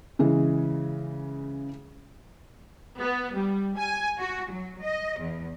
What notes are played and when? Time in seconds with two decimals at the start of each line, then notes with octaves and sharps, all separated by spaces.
0.19 C#3 E3 G#3
3.00 B3
3.37 G3
3.79 G#5
4.18 F#4
4.51 F#3
4.81 D#5
5.18 E2